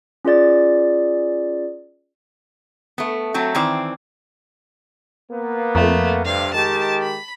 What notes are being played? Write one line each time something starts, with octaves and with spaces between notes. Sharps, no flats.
C#4 F4 G#4 D5 A6
A3 B3
F#3 A3 C4
D#3 E3 C4 D5
A#3 B3
F2 A3
G2 C3 F5
D#3 G#3 G4 A5
B5